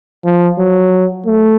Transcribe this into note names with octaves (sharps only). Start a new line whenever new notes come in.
F3
F#3
A3